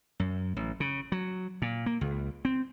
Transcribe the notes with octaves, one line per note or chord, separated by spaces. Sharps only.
F#2
A1
C#3
F#3
A#2
A#3
C#2
C4